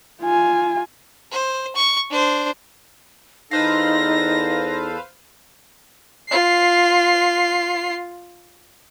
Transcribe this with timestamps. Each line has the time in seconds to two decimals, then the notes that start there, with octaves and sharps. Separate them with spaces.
0.22 F4 G#5
1.32 C5
1.76 C#6
2.10 D4 C5
3.51 E2 D#4 A4 B4 C5 F5 A#6
6.29 F4 C7